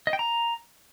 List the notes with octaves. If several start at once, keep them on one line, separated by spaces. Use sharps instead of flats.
D#5
G5
A#5